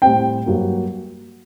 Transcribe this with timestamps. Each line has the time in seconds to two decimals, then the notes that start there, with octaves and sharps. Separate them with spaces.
0.02 A2 G3 C4 G5
0.46 G2 F#3 A#3